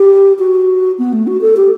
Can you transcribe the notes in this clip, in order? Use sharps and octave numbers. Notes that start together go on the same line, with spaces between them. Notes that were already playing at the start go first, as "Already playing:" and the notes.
Already playing: G4
F#4
B3
A3
F#4
A4
G4